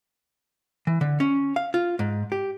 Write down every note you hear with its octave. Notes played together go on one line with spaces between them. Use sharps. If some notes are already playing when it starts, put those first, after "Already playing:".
E3
D3
C#4
F5
F4
G#2
G4